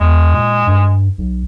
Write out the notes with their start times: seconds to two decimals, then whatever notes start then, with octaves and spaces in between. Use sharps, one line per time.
0.01 E2 G#3
0.33 A#2
0.67 G2
1.18 B1